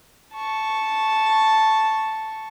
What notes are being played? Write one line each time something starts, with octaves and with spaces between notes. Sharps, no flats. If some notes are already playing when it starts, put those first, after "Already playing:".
A5 C#6